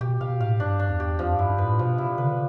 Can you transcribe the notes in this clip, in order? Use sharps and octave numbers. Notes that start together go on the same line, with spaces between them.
B2 G4
B2 F5
A2 F5
G2 D4
D4
E2
G4
F2 F3
G2 E4
G2
B4
A2
B2 F3
C3 E4
D3 B4
C3